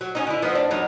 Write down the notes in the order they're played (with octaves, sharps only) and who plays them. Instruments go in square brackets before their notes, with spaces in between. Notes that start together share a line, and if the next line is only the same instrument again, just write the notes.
[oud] F#3
C#4 D#4
D3 E4
F3 B3 D#4
D4
E2 F#3 D#4